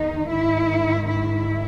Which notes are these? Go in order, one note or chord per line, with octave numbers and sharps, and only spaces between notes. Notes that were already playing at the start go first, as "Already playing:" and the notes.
Already playing: E2 D#3 D#4
G#2 D#3 E4
E4